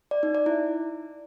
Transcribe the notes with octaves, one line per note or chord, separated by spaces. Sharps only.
D5
D#4
D5
E4